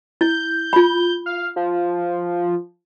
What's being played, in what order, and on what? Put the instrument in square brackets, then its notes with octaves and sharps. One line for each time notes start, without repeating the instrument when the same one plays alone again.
[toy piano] E4 [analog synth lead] G6
[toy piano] F4 B5
[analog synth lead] F5
F3